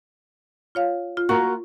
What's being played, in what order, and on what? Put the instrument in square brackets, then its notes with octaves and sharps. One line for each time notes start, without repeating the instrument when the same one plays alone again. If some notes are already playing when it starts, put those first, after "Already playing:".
[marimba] F4 C#5 F5
F4
[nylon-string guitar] A#3 F4 A#4 [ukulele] F#4 [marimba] C#6